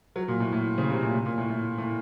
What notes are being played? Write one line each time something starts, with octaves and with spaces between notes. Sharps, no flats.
F#3
A#2
A2
A2
C#3
C3
A#2
A2
A#2
A2
A2
A2